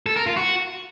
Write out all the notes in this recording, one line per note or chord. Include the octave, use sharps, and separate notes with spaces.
A4
A#4
F4
F#4